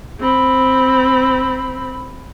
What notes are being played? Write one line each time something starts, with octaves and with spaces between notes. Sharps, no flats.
C4 B5